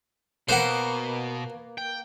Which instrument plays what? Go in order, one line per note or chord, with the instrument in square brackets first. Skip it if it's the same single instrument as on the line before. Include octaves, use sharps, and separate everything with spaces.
[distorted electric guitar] B2 [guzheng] A#3 B4 [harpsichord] C5 F#5
[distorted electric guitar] G5